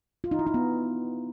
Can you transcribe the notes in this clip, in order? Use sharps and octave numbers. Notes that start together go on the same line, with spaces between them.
F4
D#4
E4
D#4
B3